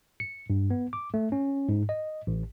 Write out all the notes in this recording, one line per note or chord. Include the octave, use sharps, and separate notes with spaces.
C#7
G2
B3
D6
A3
C#4
G#2
D#5
A1